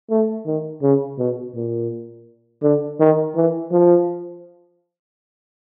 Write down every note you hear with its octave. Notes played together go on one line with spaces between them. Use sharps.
A3
D#3
C#3
B2
A#2
D3
D#3
E3
F3